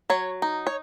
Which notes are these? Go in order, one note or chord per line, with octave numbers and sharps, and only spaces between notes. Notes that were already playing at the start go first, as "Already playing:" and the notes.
F#3 C#5
D#4
C#5